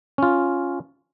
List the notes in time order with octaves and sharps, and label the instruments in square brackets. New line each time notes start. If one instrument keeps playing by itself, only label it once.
[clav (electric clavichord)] C#4 F4